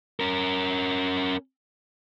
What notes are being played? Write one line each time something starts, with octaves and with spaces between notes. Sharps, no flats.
C#4 A#4